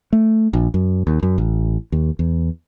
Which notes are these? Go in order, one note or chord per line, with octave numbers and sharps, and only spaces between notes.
A3
A#1
F#2
D#2
F#2
A1
D#2
E2